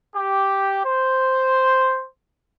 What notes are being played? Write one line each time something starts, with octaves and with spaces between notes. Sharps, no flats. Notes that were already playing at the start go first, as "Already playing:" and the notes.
G4
C5